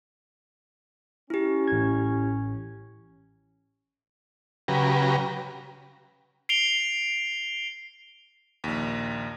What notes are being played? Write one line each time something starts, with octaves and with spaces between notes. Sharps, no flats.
C#4 E4 G4
A1 G#6
C#3 F#3 G4 B4 A#5
C7 D7 F7 G7
A#1 D#2